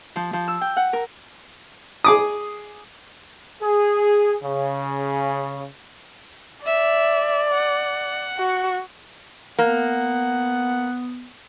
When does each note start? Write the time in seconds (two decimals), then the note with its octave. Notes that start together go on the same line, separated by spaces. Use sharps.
0.16 F3
0.33 F3
0.48 E6
0.61 G5
0.77 F#5
0.93 A#4
2.04 G#4 D6 D#6
3.62 G#4
4.43 C#3
6.66 D5 E5
7.53 F#5
8.38 F#4
9.58 A#3 B3 F#5